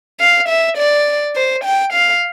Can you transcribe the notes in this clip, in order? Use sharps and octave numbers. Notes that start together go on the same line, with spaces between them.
F5
E5
D5
C5
G5
F5